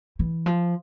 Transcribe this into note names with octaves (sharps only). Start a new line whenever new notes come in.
E3
F3